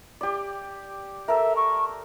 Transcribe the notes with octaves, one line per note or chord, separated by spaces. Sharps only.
G4 D5
A4 A#4 E5
C#6